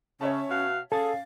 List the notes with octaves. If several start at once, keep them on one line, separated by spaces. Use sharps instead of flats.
C#3 C#4 C#5 E5 A5
B2 F#4 F5
C#4 G#4 A4 F5 G#5 A6